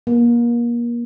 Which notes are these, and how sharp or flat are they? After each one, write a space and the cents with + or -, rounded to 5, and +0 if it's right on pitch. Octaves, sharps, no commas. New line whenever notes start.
A#3 +30